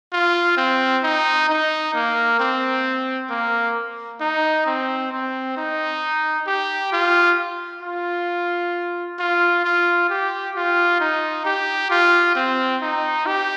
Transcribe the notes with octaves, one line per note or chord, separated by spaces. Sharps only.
F4
C4
D#4
D#4
A#3
C4
A#3
D#4
C4
C4
D#4
G4
F4
F4
F4
F4
G4
F4
D#4
G4
F4
C4
D#4
G4